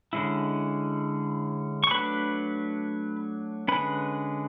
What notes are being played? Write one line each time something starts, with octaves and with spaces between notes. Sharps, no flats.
D3 G#3 C#4 E4
C#6
F#3 A3 D4 B4 B5
D3 G#3 C#4 B4 B5